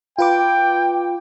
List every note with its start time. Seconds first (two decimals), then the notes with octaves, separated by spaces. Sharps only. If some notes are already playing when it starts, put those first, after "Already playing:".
0.18 F4 B4 G5 D6